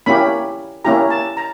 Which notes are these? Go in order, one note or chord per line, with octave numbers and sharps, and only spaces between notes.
A#3 C#4 E4 G4 B5
A#3 C#4 E4 G4 A#5
A5
A#5